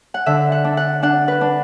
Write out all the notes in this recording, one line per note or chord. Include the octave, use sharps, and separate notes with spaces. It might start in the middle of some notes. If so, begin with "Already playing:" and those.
F#5
D3 E5
F#5
D4
F#5
D4 F#5
B4
D4